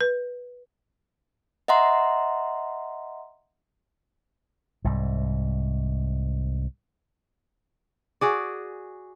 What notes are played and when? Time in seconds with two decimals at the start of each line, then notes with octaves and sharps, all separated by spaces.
0.01 B4
1.68 D#5 E5 F#5 A#5 C6
4.85 C2 G#2
8.21 F#4 G#4 D5